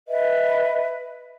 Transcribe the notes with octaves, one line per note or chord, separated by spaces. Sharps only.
B4 D#5 E5